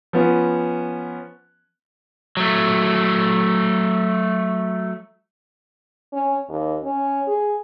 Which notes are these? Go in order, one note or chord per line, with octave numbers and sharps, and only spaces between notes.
F3 B3 C#4
F#3 A3
C#4
D#2
C#4
G#4